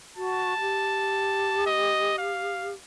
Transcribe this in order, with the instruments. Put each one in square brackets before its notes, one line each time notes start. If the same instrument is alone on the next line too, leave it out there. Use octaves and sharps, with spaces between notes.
[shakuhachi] F#4 [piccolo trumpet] A5
[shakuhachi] G4
[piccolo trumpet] D#5
F5